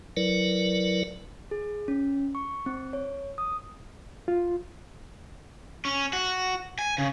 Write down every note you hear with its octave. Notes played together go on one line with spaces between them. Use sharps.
F#3 E4 A#4 B4 D5
G#4
C#4
C#6
C4
C#5
D#6
F4
C#4
F#4
G#5
C#3